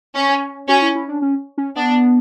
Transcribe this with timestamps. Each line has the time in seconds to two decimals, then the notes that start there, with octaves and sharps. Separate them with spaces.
0.14 C#4
0.68 C#4 F#4
0.82 E4
0.95 E4
1.09 D4
1.22 C#4
1.58 C#4
1.76 B3 D4